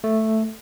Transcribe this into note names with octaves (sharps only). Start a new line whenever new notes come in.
A3